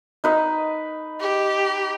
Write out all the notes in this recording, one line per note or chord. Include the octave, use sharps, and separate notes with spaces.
D#4 B4 D#5
G4